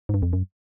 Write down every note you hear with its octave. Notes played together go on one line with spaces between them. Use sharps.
G#2
G2
F2
F#2